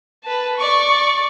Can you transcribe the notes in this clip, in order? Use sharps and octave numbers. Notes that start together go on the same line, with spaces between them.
B4 A5
D5 C#6